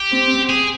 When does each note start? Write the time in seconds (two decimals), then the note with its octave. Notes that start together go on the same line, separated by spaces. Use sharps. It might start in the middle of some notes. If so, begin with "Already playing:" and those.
Already playing: G4
0.12 C4
0.49 G#4